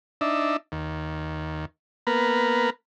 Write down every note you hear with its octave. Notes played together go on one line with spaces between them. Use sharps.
D4 D#4 E5
D#2
A#3 B3 A#4 B4